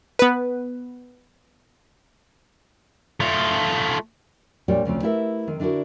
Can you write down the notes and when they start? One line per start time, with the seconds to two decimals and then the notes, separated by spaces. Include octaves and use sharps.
0.19 B3 B4
3.20 A3 F4
4.68 A#2 G3 D4 G4 C#5 G5
4.85 D2 C#3 F3 C4
5.03 A3 E4 G4 A#4 B4 E5
5.47 D#3 C4
5.60 D3 D4 E4 F#4 A#4